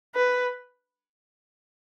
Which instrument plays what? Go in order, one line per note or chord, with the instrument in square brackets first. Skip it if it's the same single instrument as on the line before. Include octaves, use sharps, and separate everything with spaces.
[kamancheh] B4